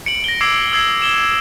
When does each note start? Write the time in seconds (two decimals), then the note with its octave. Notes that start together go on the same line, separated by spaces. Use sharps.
0.06 C#7 D7 F#7
0.24 A#6 G7
0.41 D6 E6 G#6 A#6 C7 D7
0.72 D#6 E6 G#6 C7
1.02 E7 G7